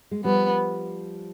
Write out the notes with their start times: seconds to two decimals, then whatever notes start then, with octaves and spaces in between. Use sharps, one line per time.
0.11 G#3
0.24 F3 G3 B3